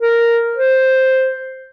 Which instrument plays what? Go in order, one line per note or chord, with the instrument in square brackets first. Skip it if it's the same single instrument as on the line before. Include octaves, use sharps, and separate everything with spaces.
[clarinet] A#4
C5